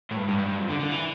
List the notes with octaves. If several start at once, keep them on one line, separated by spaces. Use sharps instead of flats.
A2
G2
G2
G2
G2
F2
D3
D3
E3